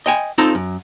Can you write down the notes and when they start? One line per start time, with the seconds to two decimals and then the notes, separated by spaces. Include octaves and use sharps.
0.06 D#5 G5 G#5
0.38 C4 D#4 F4 A4 A#5
0.55 F#2